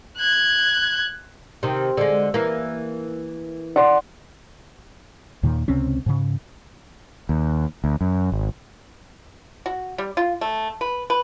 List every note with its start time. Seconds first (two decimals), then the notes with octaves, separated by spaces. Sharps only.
0.17 F#6 G#6
1.63 C3 D#3
1.97 D3 G#3
2.34 E3 A#3
3.76 D5 F#5 C6
5.43 D#2 A#2 D#3
5.68 C#2 C3 C4 C#4
6.06 G#2 C#3
7.29 D#2
7.84 D2
8.01 F#2
8.32 G#1
9.66 F#4
9.98 G3
10.17 F4
10.41 A3
10.81 B4
11.10 B4